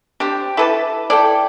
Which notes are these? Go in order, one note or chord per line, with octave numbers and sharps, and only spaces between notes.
D4 G4 C5
E4 A4 B4 E5 A5 D6
E4 A4 D5 G5